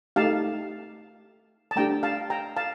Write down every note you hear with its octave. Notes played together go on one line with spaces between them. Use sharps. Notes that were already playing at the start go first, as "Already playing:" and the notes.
A3 D#4 G4 F5 A5
A5
A3 D4 G4 G5 A#5
F5 A5
G5 A#5
F5 A5